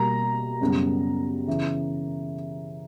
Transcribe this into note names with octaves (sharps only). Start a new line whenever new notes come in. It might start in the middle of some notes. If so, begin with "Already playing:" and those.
Already playing: B2 G3 A#3 A#5
F#2 C#3 G3 B3
C#3 E3